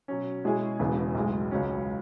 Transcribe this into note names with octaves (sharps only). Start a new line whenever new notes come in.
B2 F#3 C#4
B2 G#3 C#4 E4 G#4
E1 E2 C#3 E3 B3
B1 A2 G#3
C#2 C#3 F#3 C#4